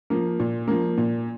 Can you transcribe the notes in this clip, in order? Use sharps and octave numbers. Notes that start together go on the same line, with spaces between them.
F3 A#3
A#2
F3 A#3
A#2